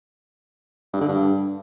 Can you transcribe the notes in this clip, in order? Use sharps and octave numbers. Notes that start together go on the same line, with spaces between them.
G2
D3
G2